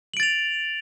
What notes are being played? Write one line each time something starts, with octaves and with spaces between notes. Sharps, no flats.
A6 D7 F7 F#7